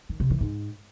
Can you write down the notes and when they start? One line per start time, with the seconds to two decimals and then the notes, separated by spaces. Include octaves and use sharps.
0.09 D#3
0.20 C3
0.30 E3
0.41 G#2